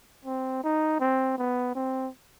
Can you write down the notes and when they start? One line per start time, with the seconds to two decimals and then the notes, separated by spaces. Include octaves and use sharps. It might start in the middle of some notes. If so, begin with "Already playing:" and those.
0.25 C4
0.64 D#4
1.00 C4
1.38 B3
1.75 C4